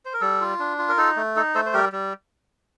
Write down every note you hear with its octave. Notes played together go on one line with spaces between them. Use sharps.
C5
A#4
G3 A4
F4
D4
F4
A#4
D#4 A4
A3
D#4 A4
A3 A4 C5
C5
G3 G4 A#4
G3